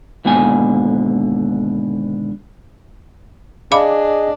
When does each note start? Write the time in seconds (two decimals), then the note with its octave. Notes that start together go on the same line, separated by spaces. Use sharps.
0.25 D#2 G#2 B2 D3 G#5
3.72 D4 G#4 D#5 F5 B5 D6